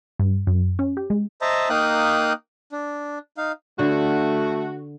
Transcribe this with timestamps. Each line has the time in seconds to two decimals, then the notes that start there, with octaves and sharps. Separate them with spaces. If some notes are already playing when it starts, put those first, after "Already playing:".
0.19 G2
0.47 F#2
0.79 C#4
0.97 G4
1.10 G#3
1.41 C5 D#5 E5 A5 A#5
1.70 A#3 D#4 F5 G5 D#6 F#6
2.72 D4
3.37 D#4 F5
3.79 D3 A3 F#4